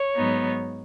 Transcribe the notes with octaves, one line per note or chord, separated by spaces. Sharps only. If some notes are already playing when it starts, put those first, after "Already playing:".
Already playing: C#5
G#2 F#3 B3 D#4